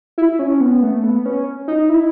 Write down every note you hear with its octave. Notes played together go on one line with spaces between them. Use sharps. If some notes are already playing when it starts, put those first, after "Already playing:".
E4
C#4
B3
A3
B3
C#4
D#4
E4